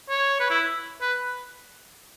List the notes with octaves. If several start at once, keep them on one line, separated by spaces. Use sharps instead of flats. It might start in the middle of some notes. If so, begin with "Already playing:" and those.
C#5
B4
E4
B4